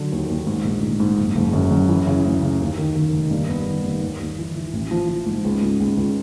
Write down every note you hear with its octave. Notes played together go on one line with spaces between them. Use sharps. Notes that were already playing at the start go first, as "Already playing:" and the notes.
Already playing: D3 F#3
D#2
D#2
G#2
A#1
G#2
G#2
F#1
F#1
F#2
F#2
E3
C#3
D2
C#3
D#2
D#3
D#3
F1
G2
B3
D#3
G2
D#2
D#2
E3
E3
A1
F3
F3
G#2
C#2
C#2
C#2
C#2